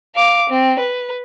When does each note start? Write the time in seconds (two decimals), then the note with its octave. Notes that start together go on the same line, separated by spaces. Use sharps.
0.15 F5 D6
0.49 C4
0.79 B4